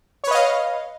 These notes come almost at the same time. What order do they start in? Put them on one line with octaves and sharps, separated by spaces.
C#5 B4 D#5 F5